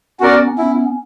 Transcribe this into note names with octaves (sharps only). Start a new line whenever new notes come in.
B3 C#4 F#4 A#4 D5
B3 C#4 E4